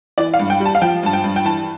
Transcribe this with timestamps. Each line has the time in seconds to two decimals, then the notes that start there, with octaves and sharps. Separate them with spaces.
0.18 E3 D5
0.34 F5
0.39 G2
0.50 G5
0.60 G3
0.66 A5
0.75 F5
0.82 F3 G5
1.03 G2 A5
1.13 G5
1.24 G2
1.36 G5
1.45 E3 A5